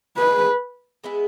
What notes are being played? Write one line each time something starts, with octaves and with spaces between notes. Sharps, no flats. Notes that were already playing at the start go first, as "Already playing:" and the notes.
G#3 B3 E4 G#4 B4
G#3 B3 E4 G#4